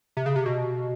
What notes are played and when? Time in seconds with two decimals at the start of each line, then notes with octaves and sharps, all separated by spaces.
0.17 C3
0.26 C#3
0.36 C3
0.46 B2